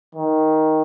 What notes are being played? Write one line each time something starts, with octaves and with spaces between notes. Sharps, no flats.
D#3